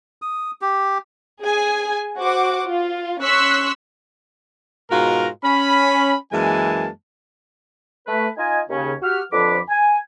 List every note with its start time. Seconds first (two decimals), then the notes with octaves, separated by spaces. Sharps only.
0.22 D#6
0.62 G4
1.43 G#4 G#5
2.18 F#4 C5 F#5 D6
2.68 F4
3.23 C#4 C6 C#6 E6 F#6 B6
4.91 G#2 B2 F4 F#4 A#4 A#5
5.44 C#4 B5
6.32 F#2 E3 G#3 A#3 G#5 A5
8.07 A3 B4
8.37 D#4 F4 D#5 G#5
8.69 D#2 C#3 C#4
9.02 F#4 G4 F6
9.31 F2 D3 F3 B4 B5 D6
9.69 G#5